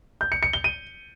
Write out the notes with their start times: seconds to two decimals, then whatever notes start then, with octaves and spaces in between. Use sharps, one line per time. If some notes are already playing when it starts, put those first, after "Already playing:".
0.21 G6
0.32 C#7
0.43 C#7
0.53 G7
0.64 D#7